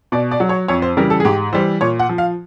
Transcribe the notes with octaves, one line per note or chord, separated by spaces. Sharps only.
B2 D5
D5
F#3
C#5
F2 C#5
C5
C#3 E3 G3 A#4
A4
G#4
G#2 G4
E3 G3 C5
A#2 C#5
F#5
F3
F5